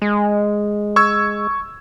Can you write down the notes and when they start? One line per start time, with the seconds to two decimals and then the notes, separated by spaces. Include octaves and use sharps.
0.02 G#3
0.96 C#6 E6 G#6